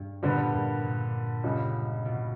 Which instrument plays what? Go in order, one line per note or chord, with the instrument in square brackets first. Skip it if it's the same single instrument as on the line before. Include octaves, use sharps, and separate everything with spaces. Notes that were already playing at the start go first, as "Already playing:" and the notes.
Already playing: [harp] G2
[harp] A#2 [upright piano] D3 G3 B3 D4
[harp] G2
A#2
[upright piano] C#2 C#3 G3
[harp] B2